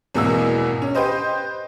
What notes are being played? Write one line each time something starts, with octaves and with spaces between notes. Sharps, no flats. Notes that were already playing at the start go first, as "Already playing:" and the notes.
G#1 E2 B2 E3 A#3 E6
C#4
G4 B4 C5 D#5